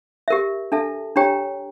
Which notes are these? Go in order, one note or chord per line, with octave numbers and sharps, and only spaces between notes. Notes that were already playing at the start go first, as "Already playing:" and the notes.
G4 A#4 E5
D4 A4 E5 A5
D4 G4 C#5 G5 A#5